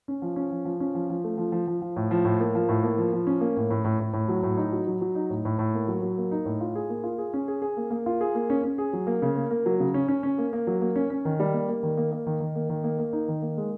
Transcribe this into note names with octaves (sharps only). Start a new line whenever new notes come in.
C#4
F3
C#4
F3
F3
C#4
F3
F3
A3
F3
F3
F3
F3
A2
F3
A2
A#3
F3
A2
A#3
F3
F3
C#4
A#3
A2
A2
A2
A2
A2
F#3
A2
D#4
F#3
F#3
F#3
D#4
A2
A2
A2
A#3
F#3
F#3
A#3
D#4
A2
F4
G#4
A#3
F4
G#4
C#4
G#4
G#4
A#3
A#3
F4
G#4
A#3
C#4
C#4
G#4
F#3
A#3
C#3
A#3
A#3
F#3
C#3
C#4
C#4
C#4
A#3
A#3
F#3
A#3
C#4
C#4
D#3
G3
A#3
A#3
D#3
A#3
A#3
D#3
D#3
A#3
D#3
A#3
A#3
D#4
D#3
A#3
G#3